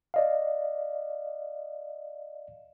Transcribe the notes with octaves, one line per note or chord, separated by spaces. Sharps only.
D5 D#5 F5